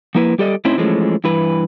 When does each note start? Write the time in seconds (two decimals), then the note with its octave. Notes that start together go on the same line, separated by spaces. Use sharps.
0.15 F3 A#3 E4 B4
0.38 G3 G4 A4 D5 D#5
0.65 A2 C4 C#4 D#4 E4 C5
0.77 E3 F3 G#3 A3 C#4
1.24 G2 E3 B4